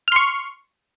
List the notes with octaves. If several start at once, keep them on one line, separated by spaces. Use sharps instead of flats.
C6 C#6 F6